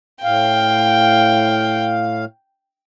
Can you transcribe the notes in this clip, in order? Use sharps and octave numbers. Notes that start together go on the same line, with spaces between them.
A2 F5 G5